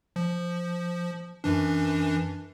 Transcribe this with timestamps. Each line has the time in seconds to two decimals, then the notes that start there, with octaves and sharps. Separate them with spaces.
0.16 F3
1.44 F#2 E3 D4